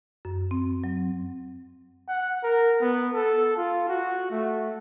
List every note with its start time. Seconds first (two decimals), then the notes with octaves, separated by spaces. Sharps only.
0.25 F#2
0.51 C4
0.84 F#3
2.09 F#5
2.43 A#4
2.81 B3
3.14 A4
3.57 F4
3.89 F#4
4.31 A3